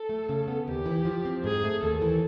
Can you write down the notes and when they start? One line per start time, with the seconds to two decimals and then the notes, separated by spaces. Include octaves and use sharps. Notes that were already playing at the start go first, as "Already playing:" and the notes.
Already playing: A4
0.09 A3
0.29 C#3
0.48 B3
0.67 D#2 G4
0.86 E3
1.05 F3
1.25 C4
1.44 G#2 G#4
1.64 A3
1.83 D#2 A4
2.02 E3